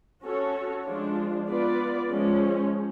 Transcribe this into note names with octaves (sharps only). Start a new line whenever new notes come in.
C#4 F#4 A4 C#5
F3 G#3 D4 F4
B3 F4 B4 D5
F3 G#3 C#4